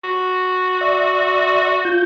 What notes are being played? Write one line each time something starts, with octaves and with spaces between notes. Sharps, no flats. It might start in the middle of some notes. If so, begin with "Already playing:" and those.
F#4
D5 E5
F4 G6